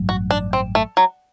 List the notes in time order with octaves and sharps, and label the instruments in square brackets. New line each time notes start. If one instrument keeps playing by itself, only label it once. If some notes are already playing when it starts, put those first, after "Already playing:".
Already playing: [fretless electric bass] A1 G2 F#3
[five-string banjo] F#4
D4
C4
A3
F#3